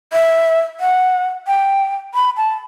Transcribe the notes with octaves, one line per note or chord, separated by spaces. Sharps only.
E5
F#5
G5
B5
A5